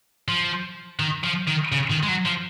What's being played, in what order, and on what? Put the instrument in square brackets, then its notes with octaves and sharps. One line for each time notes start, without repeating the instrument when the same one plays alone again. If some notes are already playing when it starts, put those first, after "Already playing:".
[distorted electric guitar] F3
D#3
F3
D#3
C#3
D#3
G#3
F#3
F3